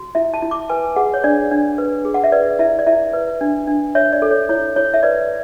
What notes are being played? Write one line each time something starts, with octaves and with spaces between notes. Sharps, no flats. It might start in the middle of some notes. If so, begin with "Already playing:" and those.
Already playing: F#4
E4 E5
A5
E4
D6
B4 G#5
G#4 F#5
C#5
D4 D5
D4
B4
G#4
F#5
E5
B4 D5
E4 E5
D5
E4 E5
B4
D4
D4
C#5 E5
D5
A4
C#5
E4 C#5
E4 C#5
E5
B4 D5